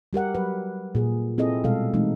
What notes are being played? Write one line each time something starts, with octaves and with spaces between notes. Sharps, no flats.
G3 G4 A#4 F#5
F#3 B4
A#2 G#4
C4 E4 G#4 A4 D#5
B2 G3 G#3 A4 F5
E3 G#3 A3 C4 D#4